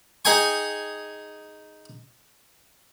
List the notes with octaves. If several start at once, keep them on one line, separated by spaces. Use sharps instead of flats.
D#4 G#4 G5 G#5 C#6